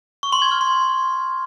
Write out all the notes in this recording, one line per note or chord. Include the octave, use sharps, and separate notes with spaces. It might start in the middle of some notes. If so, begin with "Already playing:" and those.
C#6
C6
G#6
F6
C6